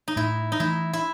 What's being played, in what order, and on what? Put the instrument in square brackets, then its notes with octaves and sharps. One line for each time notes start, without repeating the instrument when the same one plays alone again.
[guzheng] D#4
[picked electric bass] A2 [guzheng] E4
[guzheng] D#4
[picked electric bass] E3 A3 [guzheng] E4
[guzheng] E4